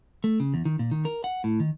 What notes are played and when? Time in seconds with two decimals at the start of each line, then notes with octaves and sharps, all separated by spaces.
0.24 A3
0.40 C#3
0.54 E2
0.65 D#3
0.79 A#2
0.91 D#3
1.05 A#4
1.24 F#5
1.44 A2
1.60 D#3